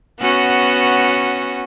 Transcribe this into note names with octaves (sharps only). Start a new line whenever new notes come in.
B3 C#4 F#4